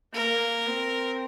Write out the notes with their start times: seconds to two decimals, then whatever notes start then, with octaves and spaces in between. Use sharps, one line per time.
0.14 A#3 A#4
0.67 C4